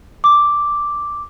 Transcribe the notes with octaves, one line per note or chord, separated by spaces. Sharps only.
D6